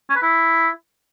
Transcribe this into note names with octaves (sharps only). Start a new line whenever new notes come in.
C#4
B4
E4